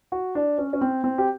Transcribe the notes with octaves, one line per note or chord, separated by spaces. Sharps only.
F#4
D4
C#4
C#4
C4
C4
G4